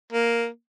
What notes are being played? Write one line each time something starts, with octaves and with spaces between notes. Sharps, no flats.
A#3